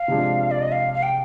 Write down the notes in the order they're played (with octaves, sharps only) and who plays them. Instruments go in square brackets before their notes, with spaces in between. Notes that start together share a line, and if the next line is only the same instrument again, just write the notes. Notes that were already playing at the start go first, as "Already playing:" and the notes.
Already playing: [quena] F5
[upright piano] C3 F3 G#3 D4
[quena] D5
D#5
F5
F5
G5